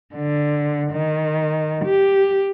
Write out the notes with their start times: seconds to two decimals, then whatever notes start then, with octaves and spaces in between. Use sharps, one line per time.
0.15 D3
0.92 D#3
1.85 G4